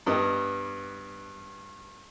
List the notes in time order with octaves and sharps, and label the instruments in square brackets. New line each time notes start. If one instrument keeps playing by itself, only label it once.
[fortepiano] G2 G3 B3 D#5